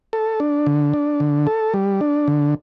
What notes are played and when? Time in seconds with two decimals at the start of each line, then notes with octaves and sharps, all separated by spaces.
0.13 A4
0.40 D4
0.66 D3
0.94 D4
1.20 D3
1.47 A4
1.74 G3
2.01 D4
2.28 D3